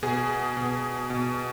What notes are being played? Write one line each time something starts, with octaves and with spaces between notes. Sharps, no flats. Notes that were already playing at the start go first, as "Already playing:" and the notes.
B2 G#4
B2
B2